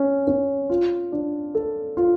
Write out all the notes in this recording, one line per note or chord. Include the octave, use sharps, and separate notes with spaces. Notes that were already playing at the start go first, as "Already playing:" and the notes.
Already playing: C#4
C#4
F4
D4
A4
F4